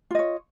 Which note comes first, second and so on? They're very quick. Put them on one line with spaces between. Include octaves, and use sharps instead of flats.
F4 D#5 C#5